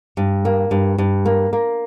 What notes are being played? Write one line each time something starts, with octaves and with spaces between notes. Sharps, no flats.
G2
A#3
G2
G2
A#3
A#3